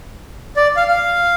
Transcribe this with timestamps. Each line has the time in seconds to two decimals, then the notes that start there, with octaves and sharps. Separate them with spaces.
0.57 D5
0.76 F5
0.88 F5